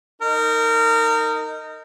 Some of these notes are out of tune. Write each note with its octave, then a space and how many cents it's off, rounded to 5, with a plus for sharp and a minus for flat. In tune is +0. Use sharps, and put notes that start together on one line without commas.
D#4 +0 A#4 -25